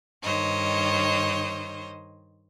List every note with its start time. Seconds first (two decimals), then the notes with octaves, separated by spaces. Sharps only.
0.24 G2 D#3 C5 C#5 D#5